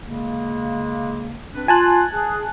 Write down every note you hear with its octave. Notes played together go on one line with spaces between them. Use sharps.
C#3 G#3 A#3
C4 D4 B4
F4 G#5 A5 F#6
G#4